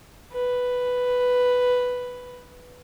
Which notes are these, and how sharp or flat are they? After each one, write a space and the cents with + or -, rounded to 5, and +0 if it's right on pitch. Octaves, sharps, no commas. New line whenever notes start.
B4 +5